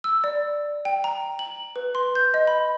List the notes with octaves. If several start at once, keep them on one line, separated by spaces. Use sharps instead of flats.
E6
D5
G5
A#5
F#7
B4
C6
G6
D#5
B5